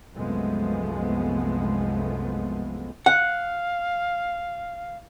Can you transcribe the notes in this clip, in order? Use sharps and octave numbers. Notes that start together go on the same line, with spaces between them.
C2 F#2 F3 G#3 A3 B3
F5 F#5